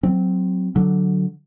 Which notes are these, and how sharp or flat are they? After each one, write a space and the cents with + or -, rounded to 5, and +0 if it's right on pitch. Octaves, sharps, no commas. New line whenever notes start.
F#3 +0 C4 -10
D3 +0 F#3 +0